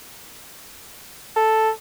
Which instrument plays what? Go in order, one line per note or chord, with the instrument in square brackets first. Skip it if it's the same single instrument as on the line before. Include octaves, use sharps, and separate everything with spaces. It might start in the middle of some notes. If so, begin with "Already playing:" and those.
[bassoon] A4